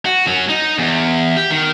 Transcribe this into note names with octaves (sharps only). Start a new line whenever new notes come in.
F#4
F#3 C#4
D#4
E2
G4
D#3